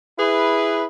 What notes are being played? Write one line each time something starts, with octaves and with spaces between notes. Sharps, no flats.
E4 G#4 B4